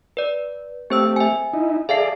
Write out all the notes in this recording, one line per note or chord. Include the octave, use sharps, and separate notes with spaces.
B4 D5
A3 C4 G4 C5 E6
E5 G#5
D#4 E4
G#4 A4 D5 E5 F5 C7